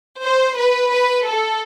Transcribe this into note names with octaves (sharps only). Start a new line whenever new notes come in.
C5
B4
B4
A4